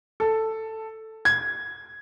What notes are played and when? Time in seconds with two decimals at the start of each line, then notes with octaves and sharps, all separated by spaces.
0.20 A4
1.25 G#6